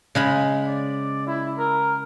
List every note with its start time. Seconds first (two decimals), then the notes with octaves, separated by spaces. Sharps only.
0.15 C#3 G#3 B5
0.67 D5
1.27 E4
1.58 A#4